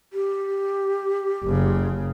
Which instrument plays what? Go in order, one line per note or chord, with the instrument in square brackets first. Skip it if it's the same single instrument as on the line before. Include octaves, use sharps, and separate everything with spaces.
[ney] G4
[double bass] F#1 C#3